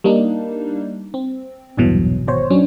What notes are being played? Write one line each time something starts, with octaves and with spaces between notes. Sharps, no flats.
G3 A#3 D4 D#4
C4
A#1 E2 G2 B2 E3 F#3
G#1 B2 C5 C#5
F#3 C#4 D4